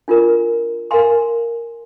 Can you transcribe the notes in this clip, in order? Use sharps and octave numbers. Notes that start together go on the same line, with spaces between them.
D4 F4 A#4
A#4 F5 G#5 C6